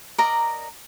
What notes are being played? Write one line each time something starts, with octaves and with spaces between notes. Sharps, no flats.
A#4 D5 D#5 A#5